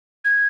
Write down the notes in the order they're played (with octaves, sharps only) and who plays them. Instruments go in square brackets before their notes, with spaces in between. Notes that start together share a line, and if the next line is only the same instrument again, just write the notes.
[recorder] G#6